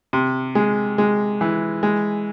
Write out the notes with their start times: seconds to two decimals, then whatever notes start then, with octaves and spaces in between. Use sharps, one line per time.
0.13 C3
0.55 G#3
0.98 G#3
1.41 E3
1.83 G#3